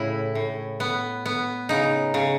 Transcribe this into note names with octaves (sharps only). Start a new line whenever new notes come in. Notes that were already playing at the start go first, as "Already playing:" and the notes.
Already playing: A2 C#3 E4
A2
B3
B3
C#3 D#4
C#3